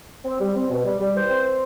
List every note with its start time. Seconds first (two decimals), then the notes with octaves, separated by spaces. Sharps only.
0.25 C4
0.39 G3
0.55 C4
0.70 B2
0.85 G3
0.99 G3
1.14 E3 C5
1.29 C4